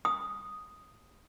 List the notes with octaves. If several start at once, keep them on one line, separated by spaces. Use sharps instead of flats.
D#6